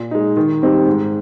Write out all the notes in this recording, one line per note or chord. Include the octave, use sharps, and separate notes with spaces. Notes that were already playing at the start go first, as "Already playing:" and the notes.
Already playing: A#2
G#3 D#4
D#3
G3 C4 D#4 G4
G#2